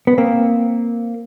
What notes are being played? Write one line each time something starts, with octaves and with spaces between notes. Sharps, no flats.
B3
A#3 C4